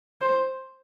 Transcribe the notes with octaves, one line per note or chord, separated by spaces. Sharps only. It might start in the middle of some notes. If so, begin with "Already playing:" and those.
C5